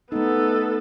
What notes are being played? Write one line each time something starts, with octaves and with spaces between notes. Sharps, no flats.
A3 B3 D#4 A4